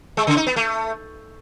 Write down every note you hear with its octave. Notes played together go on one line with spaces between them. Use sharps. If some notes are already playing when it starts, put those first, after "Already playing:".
G#3
C#3
D#4
B3
A3